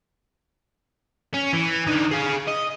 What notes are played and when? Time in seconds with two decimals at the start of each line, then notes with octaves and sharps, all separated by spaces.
1.34 C#4
1.53 E3
1.86 D3 D#3
2.11 G#4 F5
2.48 D#5